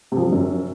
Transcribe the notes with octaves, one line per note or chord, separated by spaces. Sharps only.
C3
F3
F#3
D3
F#2